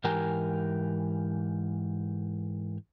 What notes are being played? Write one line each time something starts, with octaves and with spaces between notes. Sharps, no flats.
G#2 E3 G4 A#4 G#5 A#5